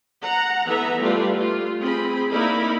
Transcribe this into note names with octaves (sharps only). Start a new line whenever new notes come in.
F#5 A#5
E3 B3 A4 E5 A#5
G3 A3 F4 G4 B4 D5
A3 F4
C4 G#4 B5
A#3 D#4 E4 A#4 D5 B5